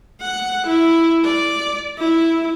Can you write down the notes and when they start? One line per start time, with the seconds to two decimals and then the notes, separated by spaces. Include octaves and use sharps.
0.21 F#5
0.67 E4
1.24 D5
1.98 E4